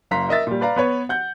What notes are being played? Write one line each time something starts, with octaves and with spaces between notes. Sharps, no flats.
F#1 F5 A#5 C6 B6
A#4 D#5 E5 A6
A#2 G3
B4 D5 F5 A#5
B3 B4 C#5
F#5 G6